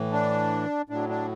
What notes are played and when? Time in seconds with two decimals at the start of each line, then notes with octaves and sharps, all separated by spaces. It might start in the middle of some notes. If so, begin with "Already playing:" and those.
Already playing: A2 E3
0.12 D4
0.89 A2 F#3 D4
1.09 D4